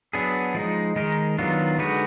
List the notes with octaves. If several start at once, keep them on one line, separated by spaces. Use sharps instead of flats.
F#3 B3 D4 G#4
F3 G#3 D#4
D#3 G#3 D#4 A#4
D#3 F#3 B3 D4 F4
D3 G#3 D#4 F#4 B4